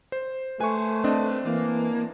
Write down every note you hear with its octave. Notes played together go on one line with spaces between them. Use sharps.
C5
A3 B4 C5 G#5 C#6
C4 D4 D#5
E3 A#3